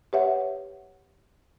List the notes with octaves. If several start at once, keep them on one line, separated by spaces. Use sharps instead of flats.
G4 B4 C#5 E5 F#5